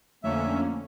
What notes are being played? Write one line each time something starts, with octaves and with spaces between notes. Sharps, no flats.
F2 D3 A3 A#3 C#4 D4 E5